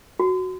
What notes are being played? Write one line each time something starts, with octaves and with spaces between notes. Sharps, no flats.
F#4